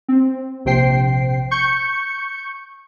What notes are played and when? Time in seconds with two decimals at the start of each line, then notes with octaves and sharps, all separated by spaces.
0.08 C4
0.65 A#1 C3 C5 G5 C7
1.51 C#6 G6 C#7